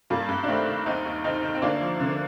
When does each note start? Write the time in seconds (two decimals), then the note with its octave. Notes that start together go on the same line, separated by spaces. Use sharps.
0.10 G2 G3 A#3
0.29 G2
0.43 D4
0.48 D#3 A3 C4
0.68 D#3
0.86 D#2 C4 D#4
1.05 D#2
1.24 D#3 C4 D#4
1.43 D#3
1.55 C4
1.62 D2 A#3 D4
1.81 F3
2.00 D3